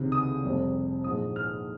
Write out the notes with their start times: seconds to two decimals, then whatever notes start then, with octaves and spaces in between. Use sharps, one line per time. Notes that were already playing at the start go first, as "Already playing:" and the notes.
Already playing: C#2 C3 D#3
0.12 D#6
0.43 F1 F2 C3 G3
1.04 A#1 G#2 F3 D#6
1.36 F6